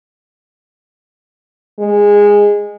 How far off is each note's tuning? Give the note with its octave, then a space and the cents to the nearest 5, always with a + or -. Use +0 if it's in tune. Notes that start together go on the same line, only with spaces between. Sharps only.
G#3 -15